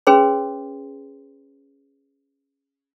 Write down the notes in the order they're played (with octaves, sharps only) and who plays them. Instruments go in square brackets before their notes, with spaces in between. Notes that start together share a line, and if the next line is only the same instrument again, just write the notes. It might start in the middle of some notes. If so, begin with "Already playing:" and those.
[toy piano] C#4 G#4 B4 C#5 C6